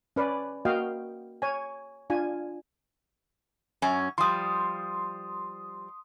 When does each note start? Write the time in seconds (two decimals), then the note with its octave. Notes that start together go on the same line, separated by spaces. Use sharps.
0.16 C#4 B4 D5
0.65 A#3 F#4 D#5 F5 G5
1.42 C#5 G#5
2.10 D4 F4 G#5
3.82 F#2 C#4
4.18 F3 G3 C6 D#6